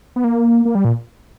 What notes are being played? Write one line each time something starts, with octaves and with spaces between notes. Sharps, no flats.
B3
A#3
A#3
G3
A#2